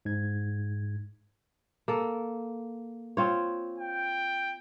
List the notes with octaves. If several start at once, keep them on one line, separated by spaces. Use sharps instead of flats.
G#2 G#6
A#3 A4
C4 F4 C#5
G5